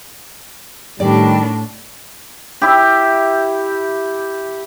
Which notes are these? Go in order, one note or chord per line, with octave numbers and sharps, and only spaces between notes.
A2 D#3 G3 D4 D5
E4 G4